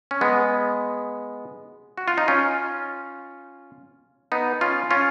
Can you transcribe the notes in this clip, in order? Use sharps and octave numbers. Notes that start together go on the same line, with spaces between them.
C#4
G#3 B3
F#4
F4
D#4
C#4 F4
B3 D#4
C#4 F4
C#4 F4